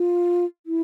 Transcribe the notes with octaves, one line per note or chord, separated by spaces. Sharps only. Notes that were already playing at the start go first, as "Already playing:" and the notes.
Already playing: F4
E4